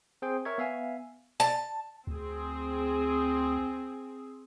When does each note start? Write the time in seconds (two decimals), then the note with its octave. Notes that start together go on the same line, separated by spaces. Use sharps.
0.22 C4 G#4 C5 G5
0.45 A#4 C#5 E5 C#6 G#6
0.58 B3 E5 F5 G#5
1.40 A5
2.07 D2 C4 G#4